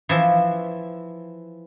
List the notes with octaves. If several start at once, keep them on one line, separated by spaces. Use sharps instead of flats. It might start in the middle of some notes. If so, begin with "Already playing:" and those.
E3 F3 E5